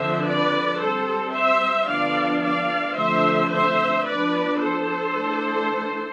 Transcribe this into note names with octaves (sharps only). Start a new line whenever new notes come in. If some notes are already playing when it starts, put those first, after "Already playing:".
Already playing: D3 F3 C4 C5 E5
B4 D5
G3 C4 A4 C5
C5 E5
D3 F3 B3 D4 D5 F5
D5 F5
D3 F3 A3 C4 C5 E5
C5 E5
F3 B3 D4 B4 D5
A4 C5
E3 A3 D4